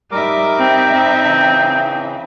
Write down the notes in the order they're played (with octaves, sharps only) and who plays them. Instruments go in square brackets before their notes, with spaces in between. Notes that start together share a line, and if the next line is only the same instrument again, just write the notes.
[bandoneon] G3 A#4 D6 [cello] D#4 E5
[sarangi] C4
C4
[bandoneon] C#3 E3